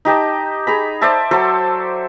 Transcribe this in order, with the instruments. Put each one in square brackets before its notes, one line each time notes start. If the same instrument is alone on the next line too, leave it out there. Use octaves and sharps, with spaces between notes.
[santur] D#4 G4 D#5 A5
G#4 A#5 B5
C5 D5 E5 A5
F#3 A4 C5